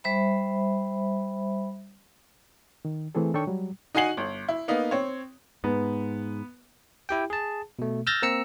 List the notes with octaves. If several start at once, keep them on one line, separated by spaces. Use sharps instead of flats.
G3 C5 E5 B5
D#3
E3 A3 C4 G#4 A4
D#3 D4 A4 C#5 G5 C#6
F#3 G3
D#4 F#4 F#5 G#5 C7 F#7
G1
E4
A#3 B3 D#4
C4 C#5
G#2 B3
E4 G4 G5
G#4 A5
B2 A3
E6 F6 G6 A6 A#6
A#3 C4 A#5 E6 C#7